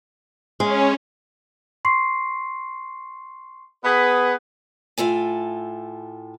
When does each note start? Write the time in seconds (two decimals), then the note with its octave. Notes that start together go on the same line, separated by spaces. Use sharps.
0.60 G#3 C#4
1.85 C6 C#6 C7
3.84 B3 G#4 B4
4.98 A2 F4 A4 G#5